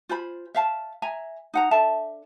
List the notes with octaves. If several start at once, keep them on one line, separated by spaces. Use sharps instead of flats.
F4 C5 G#5 B5
E5 F5 A5
E5 G#5 A#5
D#4 F#5 A#5
D4 A4 E5 A5